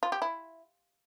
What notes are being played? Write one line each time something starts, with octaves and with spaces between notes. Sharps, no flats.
F4
G4
E4